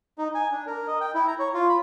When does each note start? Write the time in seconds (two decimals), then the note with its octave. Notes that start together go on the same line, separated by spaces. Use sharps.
0.18 D#4
0.35 G#5
0.52 D4
0.67 A#4
0.87 D#5
1.01 G5
1.14 E4
1.27 A#5
1.39 C#5
1.54 F4
1.69 B5